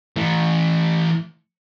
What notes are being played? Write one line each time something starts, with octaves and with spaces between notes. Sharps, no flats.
E3 A3